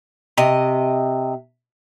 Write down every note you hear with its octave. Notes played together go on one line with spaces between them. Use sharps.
C3 D#5